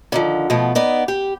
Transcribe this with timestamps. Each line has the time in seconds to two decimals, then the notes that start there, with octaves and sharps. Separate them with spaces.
0.12 D3 D#3 F3
0.50 B2 F3 A3 B3
0.75 B3 D#4 D5
1.08 G4